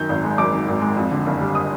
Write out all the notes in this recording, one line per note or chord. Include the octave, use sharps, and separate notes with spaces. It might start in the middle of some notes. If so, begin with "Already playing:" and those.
Already playing: F#2 D#3 G6
G#1
G#3
F#2 D6
D#3
G#1
G#3
F2
D3
F#1
G3
D#6